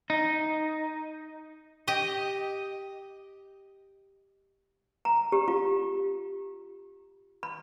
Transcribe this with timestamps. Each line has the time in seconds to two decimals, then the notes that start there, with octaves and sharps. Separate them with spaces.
0.10 D#4
1.88 G4 D#5
5.05 A#5
5.32 G4
5.48 F4
7.43 B5